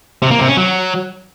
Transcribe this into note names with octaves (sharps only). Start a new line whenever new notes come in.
C3
A#3
C3
C#4
F#3